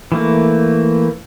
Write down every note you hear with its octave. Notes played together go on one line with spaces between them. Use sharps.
E3 A3 A#3